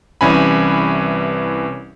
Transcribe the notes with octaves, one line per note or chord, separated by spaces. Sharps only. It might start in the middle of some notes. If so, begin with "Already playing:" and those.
C2 E3 C#4 G#5 B5